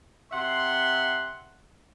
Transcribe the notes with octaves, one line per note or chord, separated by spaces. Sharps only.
C3 E5 F#5 C6